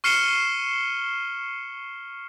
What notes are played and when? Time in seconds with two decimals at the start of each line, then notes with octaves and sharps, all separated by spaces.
0.04 C#6 F6 C7 C#7 E7 G7